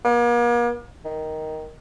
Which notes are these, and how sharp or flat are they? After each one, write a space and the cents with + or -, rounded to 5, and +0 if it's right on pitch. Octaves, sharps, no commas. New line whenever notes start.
A#3 +40
D#3 +5